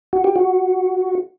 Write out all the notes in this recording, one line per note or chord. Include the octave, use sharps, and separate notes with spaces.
F#4
G4
F#4